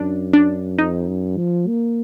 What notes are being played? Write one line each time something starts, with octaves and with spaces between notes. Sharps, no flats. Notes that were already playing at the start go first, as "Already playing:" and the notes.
Already playing: F#2 D4
D4
F2 D#4
F#2
F3
A#3